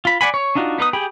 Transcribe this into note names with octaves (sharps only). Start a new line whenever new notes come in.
F4 B5
D5 F#5 G#5 B5
C#5
D4 D#4 F4 F#4
B3 D#4 B4 D#6
G4 G#4 G5 B5